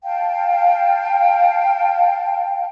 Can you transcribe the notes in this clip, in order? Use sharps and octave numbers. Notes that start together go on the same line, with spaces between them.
F5 G5 A5